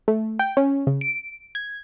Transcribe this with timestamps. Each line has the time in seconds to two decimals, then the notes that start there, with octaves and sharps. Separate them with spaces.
0.08 A3
0.39 G5
0.57 C#4
0.87 C#3
1.01 D7
1.55 G#6